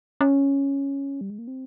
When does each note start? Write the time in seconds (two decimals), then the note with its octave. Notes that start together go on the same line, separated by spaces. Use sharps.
0.21 C#4
1.21 G3
1.30 G#3
1.39 A#3
1.48 C4